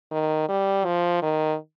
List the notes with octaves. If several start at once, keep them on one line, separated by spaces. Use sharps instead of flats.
D#3
G3
F3
D#3